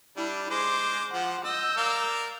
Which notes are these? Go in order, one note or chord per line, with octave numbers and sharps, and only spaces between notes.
G3 D4 E4
G#3 G#4 C5 D6
F3 C5 F#5
D#5 E6 G6
A#4 D5 F5